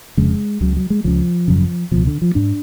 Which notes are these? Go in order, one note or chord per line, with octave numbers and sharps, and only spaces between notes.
F1 F2 C#3 G#3
C#2 C#3 F#3
F#3
G#3
C#2 C#3 F3
G#1 F#2 C#3
C#2 B2 F3
D3
F3
G#2 D4